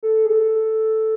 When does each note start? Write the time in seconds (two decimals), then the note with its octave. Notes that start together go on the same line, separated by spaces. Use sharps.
0.03 A4
0.26 G#4
0.29 A4